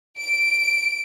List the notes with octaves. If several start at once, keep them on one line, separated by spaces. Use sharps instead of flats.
D7